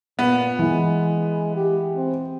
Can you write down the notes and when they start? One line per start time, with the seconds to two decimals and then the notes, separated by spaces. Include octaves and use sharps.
0.19 A#2 B3
0.59 E3 G#3
1.56 G4
1.96 C4